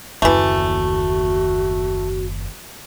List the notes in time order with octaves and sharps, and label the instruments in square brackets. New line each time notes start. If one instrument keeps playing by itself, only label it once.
[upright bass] F#1 D#2 [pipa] E3 A3 [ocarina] F#4